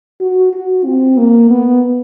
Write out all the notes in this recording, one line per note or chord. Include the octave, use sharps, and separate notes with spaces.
F#4
F#4
C4
A#3
B3